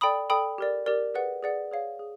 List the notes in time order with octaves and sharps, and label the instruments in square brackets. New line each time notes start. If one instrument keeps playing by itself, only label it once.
[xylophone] A4 D5 G5 B5 D#6
A4 D5 G5 B5 D#6
G4 A#4 D5
G4 A#4 D5
G#4 B4 D5 F#5
G#4 B4 D5 F#5
G#4 C#5 F5
G#4